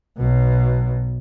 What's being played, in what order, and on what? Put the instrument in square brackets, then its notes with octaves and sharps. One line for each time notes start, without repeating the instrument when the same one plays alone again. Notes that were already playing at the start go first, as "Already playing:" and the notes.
[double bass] B1 B2